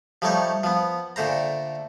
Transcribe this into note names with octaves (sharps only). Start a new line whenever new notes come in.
F3 G3 A3 D#4 C#5
F3 B3
A#2 D3 A3 C5 A#5